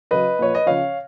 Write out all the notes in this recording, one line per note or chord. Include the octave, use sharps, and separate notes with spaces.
C#3 F#3 B4 D#5
A#2 F3 C#5
D#5
C#3 F3 C#5 F5